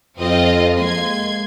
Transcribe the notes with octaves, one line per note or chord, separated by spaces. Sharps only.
F2 C4 F4 D#5
G#3 A#3 C6 G#6